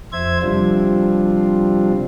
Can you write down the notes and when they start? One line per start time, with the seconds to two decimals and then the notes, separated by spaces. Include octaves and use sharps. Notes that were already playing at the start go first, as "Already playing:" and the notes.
0.12 F2 C5 E5 G#6
0.42 C3 F3 G3 C4 D4 F4